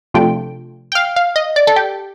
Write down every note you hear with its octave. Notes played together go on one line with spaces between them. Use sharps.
C3 F3 A3 D4 F4 G5
G5
F5
F5
D#5
D5
A4
G4